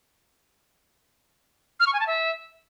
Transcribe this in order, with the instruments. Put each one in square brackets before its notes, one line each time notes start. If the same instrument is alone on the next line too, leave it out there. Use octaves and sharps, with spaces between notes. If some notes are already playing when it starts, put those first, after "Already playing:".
[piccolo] F6
C#6
G#5
A5
E5